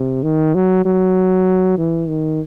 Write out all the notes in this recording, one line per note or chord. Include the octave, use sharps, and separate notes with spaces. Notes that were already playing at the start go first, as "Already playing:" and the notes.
Already playing: C3
D#3
F#3
F#3
E3
D#3